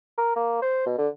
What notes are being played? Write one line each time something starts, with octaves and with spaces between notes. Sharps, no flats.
A#4
A#3
C5
B2
D3